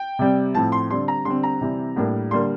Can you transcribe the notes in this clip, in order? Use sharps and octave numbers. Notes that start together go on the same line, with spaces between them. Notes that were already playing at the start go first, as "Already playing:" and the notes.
Already playing: G5
C3 G3 C4
A2 F3 C4 A5
C6
D3 G3 C4 C6
A#5
D3 G3 C4 C6
A#5
C3 E3 G3 C4
A2 G3 A#3 D4
D3 G3 A#3 C6